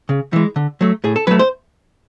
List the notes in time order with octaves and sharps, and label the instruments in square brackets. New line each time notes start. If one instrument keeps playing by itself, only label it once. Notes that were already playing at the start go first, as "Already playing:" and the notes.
[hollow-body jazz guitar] C#3
E3 G#3
D3
F#3 A3
A2 G#4
A4
F#3 A3 B4
C5